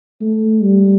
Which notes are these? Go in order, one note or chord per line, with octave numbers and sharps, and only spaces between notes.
A3
G3